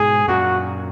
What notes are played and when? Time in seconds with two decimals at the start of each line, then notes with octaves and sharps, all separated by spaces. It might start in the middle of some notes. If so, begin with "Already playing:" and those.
Already playing: G#2 B2 G#4
0.28 F#2 A#2 F#4